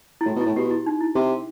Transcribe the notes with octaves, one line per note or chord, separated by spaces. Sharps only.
E4
A2 F#4
B2
E4
A2
B2 G4
F#4
E4
D#4
E4
C3